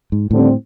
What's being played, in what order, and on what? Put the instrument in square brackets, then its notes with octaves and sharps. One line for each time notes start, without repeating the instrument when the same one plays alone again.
[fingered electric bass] G#2
[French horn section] D#2 D3 G3 C4 [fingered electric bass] A2